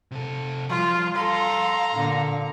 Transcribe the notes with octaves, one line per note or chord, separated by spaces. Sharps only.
C3 A4
F3 G3 F4
A4 F5 A#5 C6
A#2 D3